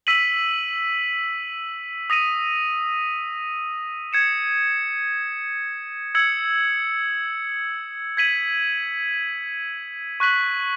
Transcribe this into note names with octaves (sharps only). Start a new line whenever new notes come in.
E6 B6 D#7 F#7
D#6 A#6 D#7
G#6 C#7 E7
E6 G#6 C#7 F#7
G#6 B6 D#7 F#7
C#6 F#6 B6 F#7